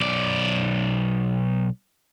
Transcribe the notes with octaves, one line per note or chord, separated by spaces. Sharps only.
B1 D5